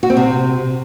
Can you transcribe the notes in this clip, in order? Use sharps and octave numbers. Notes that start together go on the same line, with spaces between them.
F#4
C4
C3